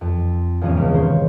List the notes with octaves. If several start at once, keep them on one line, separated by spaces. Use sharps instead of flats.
F2
E2 G#2 F3 G3 B3 C#4
C#2 G#3
D#3 C5 C#5